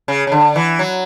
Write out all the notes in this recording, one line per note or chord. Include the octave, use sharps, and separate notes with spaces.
C#3
C#3
D3
E3
F#3